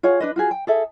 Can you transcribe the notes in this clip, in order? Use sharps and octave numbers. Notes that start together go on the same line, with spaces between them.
F4 G#4 C#5 F#5
D4 B4 D#5
F4 F#4 G#4
G5
G#4 A4 E5